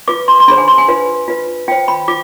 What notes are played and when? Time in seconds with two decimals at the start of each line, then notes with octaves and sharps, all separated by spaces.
0.08 F4 B4 D6
0.28 C6
0.40 C6
0.48 D4 G#4 C5 B5
0.58 G#5
0.68 C6
0.78 G#5
0.88 F4 B4
1.28 F4 B4
1.68 F4 C5 G5
1.88 B5
2.08 F4 D6